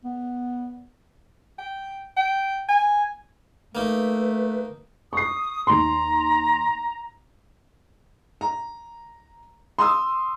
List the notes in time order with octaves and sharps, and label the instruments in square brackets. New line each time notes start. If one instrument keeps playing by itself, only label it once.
[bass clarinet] B3
[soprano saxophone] G5
G5
G#5
[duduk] A3 [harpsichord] A#3 D#4 [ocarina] B4
[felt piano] C#6 C7 [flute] D#6
[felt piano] D#2 C6 [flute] A#5
[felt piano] A#5
C6 D#6 E6